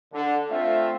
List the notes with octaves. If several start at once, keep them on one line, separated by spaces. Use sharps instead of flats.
D3
A3 C4 F4 E5